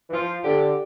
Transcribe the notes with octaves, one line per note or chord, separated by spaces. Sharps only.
E3
F3 F4
D3 G4